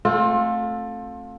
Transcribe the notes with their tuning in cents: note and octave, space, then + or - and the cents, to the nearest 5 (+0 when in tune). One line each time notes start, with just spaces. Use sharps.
A3 +0 C4 +20 F4 +30